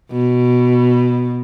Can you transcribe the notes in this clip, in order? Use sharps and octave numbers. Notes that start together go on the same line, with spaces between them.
B2